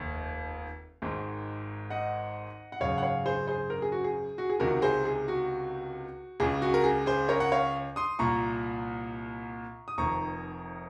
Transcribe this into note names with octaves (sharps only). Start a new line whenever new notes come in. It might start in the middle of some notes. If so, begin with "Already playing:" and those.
Already playing: F1 D#2
G#1 G#2 D#3
D#5 F#5
F#5
G#1 F#2 C#3 C#5 F5
F#5
C#5 F5
G#4 C5
G#4 C5
A#4
G#4
F#4
G#4
F#4
G#4
C#2 C3 D#3 F#4 A#4
G#4 C5
G#4
F#4
C#2 C#3 G#4
F#4
A#4
G#4
G#4 C5
A#4 C#5
F#5
C#5 F5
C6 D#6
C2 A#2 A#5 C#6
D#6
F1 F2 D#3 A#5 C#6